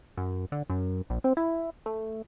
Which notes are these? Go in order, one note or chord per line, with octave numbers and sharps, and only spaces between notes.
F#2
D3
F#2
A#1
C4
E4
A3